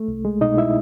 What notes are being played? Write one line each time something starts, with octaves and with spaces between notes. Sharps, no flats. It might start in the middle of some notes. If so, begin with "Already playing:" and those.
Already playing: A3
C2
G#3
B2 D#4 D#5
E4 E5